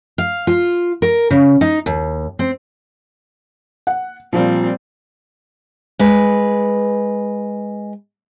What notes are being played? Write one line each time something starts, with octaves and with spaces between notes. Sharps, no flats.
F5
F4
A#4
C#3
D#4
D#2
C4
F#5
A#2 F3 G3 C4
G#3 B4